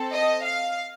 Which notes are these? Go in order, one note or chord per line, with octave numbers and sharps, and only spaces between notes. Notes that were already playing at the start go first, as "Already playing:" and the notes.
Already playing: C4 A4
D#5
F5